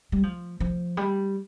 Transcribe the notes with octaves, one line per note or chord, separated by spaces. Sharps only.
G3
F3
F3
G3